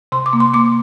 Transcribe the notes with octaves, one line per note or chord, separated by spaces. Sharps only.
C3 C6
D6
A#3
C6
A#3 D6